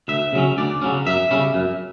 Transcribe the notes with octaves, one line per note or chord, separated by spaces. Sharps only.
D2 E5
C#3 F#3 C#4
D2 D5
C#3 F#3 C#4
F#2 E5
C#3 G3 C#4
F#2